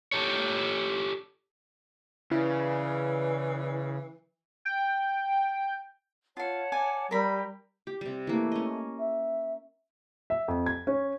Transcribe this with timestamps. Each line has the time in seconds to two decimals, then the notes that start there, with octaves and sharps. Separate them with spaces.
0.12 G4 A4 C#5
2.31 C#3 E3 E4 B4 D5
4.65 G5
6.37 F4 C#5 F5 F#5 A5
6.72 D5 G#5
7.11 G3 G4 A#4 B5
7.87 G4
8.01 C3 G3
8.27 E3 A3 A#3
8.52 C#4 D#5
8.99 E5
10.30 E5
10.48 F2
10.66 G#6
10.87 C#4